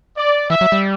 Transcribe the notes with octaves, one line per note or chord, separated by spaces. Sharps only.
D5
E3 E5
F#3
G3